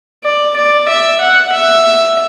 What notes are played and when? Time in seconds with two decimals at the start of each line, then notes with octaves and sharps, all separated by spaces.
0.24 D5
0.56 D5
0.88 E5
1.21 F#5
1.52 E5